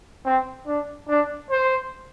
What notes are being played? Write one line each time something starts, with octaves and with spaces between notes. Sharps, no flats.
C4
D4
D4
C5